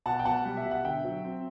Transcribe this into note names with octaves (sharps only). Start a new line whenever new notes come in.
B2 F#5 A5
G5
B2 F#5 A5
G3
E5
B2
F#5
D3 E5 G5
F#3
C4